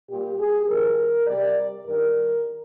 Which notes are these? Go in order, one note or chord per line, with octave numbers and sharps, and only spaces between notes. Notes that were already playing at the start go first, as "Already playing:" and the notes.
A#2 G3 G4
G#4
F2 D#3 G3 A#4
C3 G3 D5
G2 D#3 G3 A#4